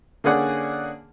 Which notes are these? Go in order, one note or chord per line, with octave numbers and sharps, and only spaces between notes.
D3 A#3 C#4 G#4 D5 F#5